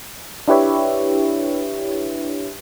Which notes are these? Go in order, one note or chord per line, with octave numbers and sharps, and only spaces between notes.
D4 E4 G4 B4 C#5 E5